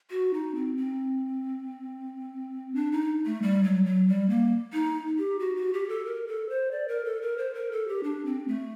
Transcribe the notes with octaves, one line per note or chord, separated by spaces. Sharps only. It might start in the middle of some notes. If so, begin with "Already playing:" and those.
F#4
D#4
C4
C4
D4
D#4
A3
G3
F#3
F#3
G3
A#3
D#4
G4
F#4
F#4
G4
A4
A#4
A4
C5
D5
A#4
A4
A#4
C5
A#4
A4
G4
D4
C4
A3